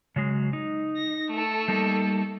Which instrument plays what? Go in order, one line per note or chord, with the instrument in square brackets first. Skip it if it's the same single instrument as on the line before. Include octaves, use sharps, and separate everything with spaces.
[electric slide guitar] C#3 F#3 G#3
D#4
[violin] A#6
A3 A4
[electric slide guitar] G3 A#3 D#4